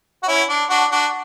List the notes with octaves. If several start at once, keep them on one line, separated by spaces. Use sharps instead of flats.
F#4
C#4 E4
D4
D4 F#4
D4 F#4